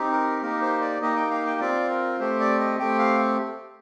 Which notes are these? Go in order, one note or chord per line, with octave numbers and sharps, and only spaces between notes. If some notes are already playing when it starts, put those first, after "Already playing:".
Already playing: C4 D#4 G4
A#4
A#3 D#4 G4 A#4
C5
D5
A#3 D#4 G4 D#5
G5
F5
G5
C4 F4 D5
A#4
A3 C4 G4 C5
D5
D#5
A3 C4 G4 G5
F5